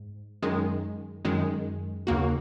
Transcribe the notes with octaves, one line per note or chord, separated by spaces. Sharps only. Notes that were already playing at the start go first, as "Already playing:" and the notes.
Already playing: G#2
F#2 D#3 G#3
F#2 D#3 G#3
D#2 C#3 A#3 F#4